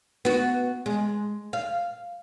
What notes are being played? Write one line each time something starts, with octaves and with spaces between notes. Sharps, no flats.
B3 F#4
G#3
F5